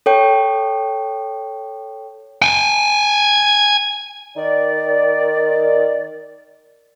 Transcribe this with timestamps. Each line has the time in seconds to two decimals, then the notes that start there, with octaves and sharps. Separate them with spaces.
0.06 A4 C#5 G5
2.42 G5 G#5
4.36 D#3 D5